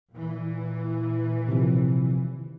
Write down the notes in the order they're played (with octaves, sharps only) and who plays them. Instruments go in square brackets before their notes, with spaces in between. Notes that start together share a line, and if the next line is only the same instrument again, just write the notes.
[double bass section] A#2 E3
[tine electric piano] C3 D#3 F3